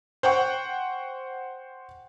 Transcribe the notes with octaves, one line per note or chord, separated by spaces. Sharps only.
C5 F#5 G5 C#6